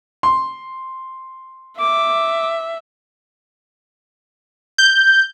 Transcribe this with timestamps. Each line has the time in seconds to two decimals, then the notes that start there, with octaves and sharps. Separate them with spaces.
0.23 C6
1.80 E5 D6
4.78 G6